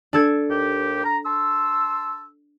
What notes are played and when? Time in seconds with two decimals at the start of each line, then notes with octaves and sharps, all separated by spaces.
0.13 D4 A4 G#6
0.49 D#2 G4
1.03 A#5
1.25 A5 C6 E6